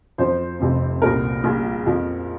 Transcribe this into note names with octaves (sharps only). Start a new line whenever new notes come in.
F2 F3 C5
F1 F2 C3
C2 A#2 G3 A#4
A#1 A#2 G3
F2 F3